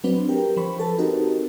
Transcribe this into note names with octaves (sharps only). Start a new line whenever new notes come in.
F#3 C4 D4 B4
G4 A#4 G5
F3 C5 B5 C#6
A4 B4 A5
C4 D#4 F#4 G4 A4 A#4